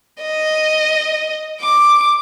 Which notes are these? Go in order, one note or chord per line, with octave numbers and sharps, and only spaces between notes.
D#5
D6